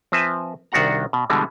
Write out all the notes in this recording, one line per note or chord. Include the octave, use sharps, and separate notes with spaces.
F3 C4 B4 E5 G#5
C2 D#3 D4 F#4 F#5 A#5
B2
B2 D3 E3 G3 G#3